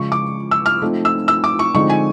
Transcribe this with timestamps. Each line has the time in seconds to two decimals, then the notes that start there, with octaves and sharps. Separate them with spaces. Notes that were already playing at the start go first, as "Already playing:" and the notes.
Already playing: C#3 F3 G#3 C#6
0.12 D6
0.51 E6
0.66 F6
0.82 F3 A3 C4 D#4
1.05 E6
1.28 E6
1.44 D6
1.59 C#6
1.74 D3 F3 G#3 C4 D#4 C#6
1.90 G#5